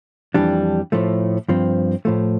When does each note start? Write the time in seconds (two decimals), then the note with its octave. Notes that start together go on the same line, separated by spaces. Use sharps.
0.34 F2 E3 G3 D4
0.92 A2 F3 A3
1.49 G2 F3 C4
2.05 A2 F3 A3